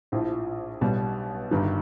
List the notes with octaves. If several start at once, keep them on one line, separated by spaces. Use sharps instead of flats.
A#1 A2 F3 C5
B1 B2 G3
G1 G2 D#3 G3